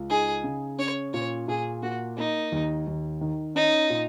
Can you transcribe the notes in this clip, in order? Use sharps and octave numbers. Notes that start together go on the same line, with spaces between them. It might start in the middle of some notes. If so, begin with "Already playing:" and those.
Already playing: C#2
D#4 G#4
C#3
C#4 C#5
A#2 C#5
A#2 G#4
A#3 F#4
A#3 D#4
D#2
D#2
D#3
C#4 D#4
A#2